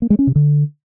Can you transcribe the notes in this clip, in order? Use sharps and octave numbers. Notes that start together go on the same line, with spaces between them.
A#3
G#3
C#4
C3
D3